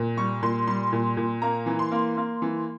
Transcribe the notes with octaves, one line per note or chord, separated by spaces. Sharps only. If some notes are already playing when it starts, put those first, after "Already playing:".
Already playing: A#2
G3 C#6
A#2 C6
G3 C6
A#2
A#2
A#3 A#5
E3
C6
A#3
A#3
E3